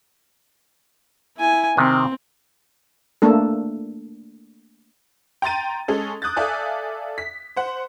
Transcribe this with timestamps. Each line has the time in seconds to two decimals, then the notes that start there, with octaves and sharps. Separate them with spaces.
1.37 E4 G#5
1.77 C3 D#3 C4
3.22 A3 A#3 D4 A4
5.42 G5 A#5 C6 A6 D#7
5.88 G#3 C#4 G#4 A4
6.22 D6 D#6 F#6 G6 A6
6.36 A4 D5 E5 F5 G#5
7.18 B6
7.56 C5 F#5